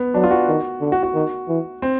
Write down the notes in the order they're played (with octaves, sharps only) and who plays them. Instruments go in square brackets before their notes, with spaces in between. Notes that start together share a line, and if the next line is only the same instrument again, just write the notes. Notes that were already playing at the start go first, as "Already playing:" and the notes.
Already playing: [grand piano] B3
[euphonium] F#3 [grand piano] D4
[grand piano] F4
F#4
[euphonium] D#3
D3
[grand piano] F#4
F#4
[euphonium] D#3
E3
[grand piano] C4